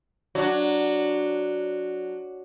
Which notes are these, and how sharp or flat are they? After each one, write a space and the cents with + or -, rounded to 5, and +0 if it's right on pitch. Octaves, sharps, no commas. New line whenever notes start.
F#3 +0 D4 +0 F#4 +0